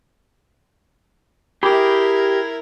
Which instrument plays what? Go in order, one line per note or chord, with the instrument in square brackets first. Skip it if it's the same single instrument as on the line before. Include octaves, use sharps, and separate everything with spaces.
[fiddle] E4 A#4 [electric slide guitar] G4 [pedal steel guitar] G#4 B5 D6